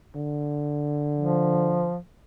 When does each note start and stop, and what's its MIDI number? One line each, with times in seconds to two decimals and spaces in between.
0.15 1.94 50
1.17 1.97 53